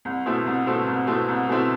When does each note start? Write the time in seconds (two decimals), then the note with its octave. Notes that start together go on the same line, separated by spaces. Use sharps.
0.05 C2
0.26 B2 A3 C4 E4
0.46 C2
0.66 B2 A3 C4 E4
0.87 C2
1.07 B2 A3 C4 E4
1.28 C2
1.49 B2 A3 C4 E4